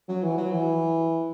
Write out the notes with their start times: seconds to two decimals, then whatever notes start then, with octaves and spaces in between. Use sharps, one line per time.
0.08 F#3
0.23 E3
0.37 F#3
0.52 E3